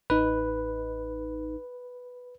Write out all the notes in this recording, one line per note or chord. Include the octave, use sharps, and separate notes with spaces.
A1 D#4 B4